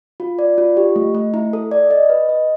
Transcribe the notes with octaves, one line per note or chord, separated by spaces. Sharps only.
F4
D5
F4
G4
A3
A3
E4
A4
D5
D#5
B4
D#5